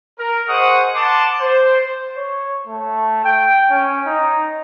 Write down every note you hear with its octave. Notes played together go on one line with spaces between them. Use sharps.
A#4
G#4 C5 D#5 F#5 C#6 D#6
F#5 A5 C6 D6
C5
C#5
A3
G5
C#4
D#4